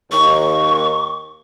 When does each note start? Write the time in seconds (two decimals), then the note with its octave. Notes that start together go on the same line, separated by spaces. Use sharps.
0.12 D#2 C#6